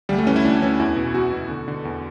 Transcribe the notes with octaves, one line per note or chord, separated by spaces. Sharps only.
D2 G3
A3
E3 C#4
E4
D2 D4
E3 C#4
E2 E4
B2
E2 F#4
B2
D3
D3
E2